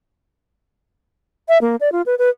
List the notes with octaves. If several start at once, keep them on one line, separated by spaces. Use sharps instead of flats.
E5
A#3
D5
F4
B4
B4